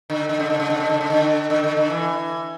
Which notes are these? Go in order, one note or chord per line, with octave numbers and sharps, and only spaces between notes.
D3
D3
C#3
D3
C#3
D3
C#3
D3
C#3
D3
D3
D3
D3
E3